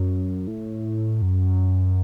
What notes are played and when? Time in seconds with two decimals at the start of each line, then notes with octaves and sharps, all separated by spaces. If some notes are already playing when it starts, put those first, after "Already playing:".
Already playing: F#2
0.47 A2
1.22 F#2